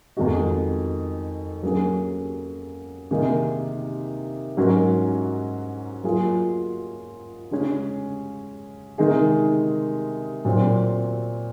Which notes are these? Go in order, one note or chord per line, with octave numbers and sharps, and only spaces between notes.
F2 D#3 G#3 D#4 F#4
F#3 A#3 C#4 G#4
C3 D#3 A#3 D#4 G#4
G#2 F#3 C#4 F#4 A#4
F#3 A#3 F4 G#4
C#3 G#3 C#4
C3 D#3 G#3 D#4 G#4
A#2 F#3 C4